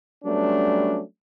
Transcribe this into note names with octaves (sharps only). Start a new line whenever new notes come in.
F#3 G3 A3 B3 C#4 D4